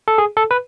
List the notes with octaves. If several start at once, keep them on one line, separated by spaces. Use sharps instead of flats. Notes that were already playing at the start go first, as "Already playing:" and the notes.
A4
G#4
A4
B4